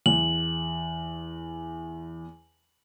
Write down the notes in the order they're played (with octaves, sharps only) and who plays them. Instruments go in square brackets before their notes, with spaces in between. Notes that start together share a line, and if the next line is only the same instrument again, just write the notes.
[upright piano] E2 [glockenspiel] F#7